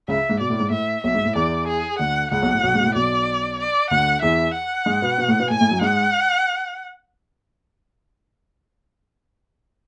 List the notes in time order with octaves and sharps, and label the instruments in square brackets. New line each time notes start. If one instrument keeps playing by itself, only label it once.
[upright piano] C#2 C#3 [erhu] E5
[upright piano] G#2
[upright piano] B2 [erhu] D5
[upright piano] A2
G#2
[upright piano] A2 [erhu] E5
[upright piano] B1 B2 [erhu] E5
[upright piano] G#2
A2
[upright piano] E2 E3 [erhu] D5
[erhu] G#4
[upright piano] D2 D3 [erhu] F#5
[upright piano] C#2 C#3 [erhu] F#5
[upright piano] B1 B2
A2
B1 B2
G#2
B2
A2
[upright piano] B1 B2 [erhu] D5
[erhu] D5
[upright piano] D2 D3 [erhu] F#5
[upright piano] E2 E3 [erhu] E5
[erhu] F#5
[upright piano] G#2 G#3
B2 B3
B2 B3
A2 A3
B2 B3
[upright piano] A2 A3 [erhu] G#5
[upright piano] A2 A3
F#2 F#3
[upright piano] G#2 G#3 [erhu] F#5